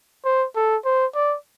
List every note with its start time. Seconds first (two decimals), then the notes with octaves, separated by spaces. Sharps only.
0.25 C5
0.56 A4
0.85 C5
1.15 D5